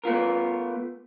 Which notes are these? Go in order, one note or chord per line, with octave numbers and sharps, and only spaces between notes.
A3 B3 F4 A#4